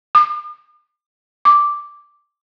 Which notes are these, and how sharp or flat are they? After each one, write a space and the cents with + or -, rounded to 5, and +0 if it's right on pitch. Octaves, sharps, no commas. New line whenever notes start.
D6 +45
D6 -5